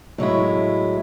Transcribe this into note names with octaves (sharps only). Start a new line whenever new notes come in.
A2 F#3 G#3 E4